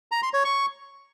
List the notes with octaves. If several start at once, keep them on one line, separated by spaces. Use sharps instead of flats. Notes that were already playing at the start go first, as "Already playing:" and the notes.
A#5
C6
C#5
C#6